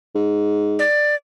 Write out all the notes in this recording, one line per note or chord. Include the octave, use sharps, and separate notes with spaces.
G#2
D5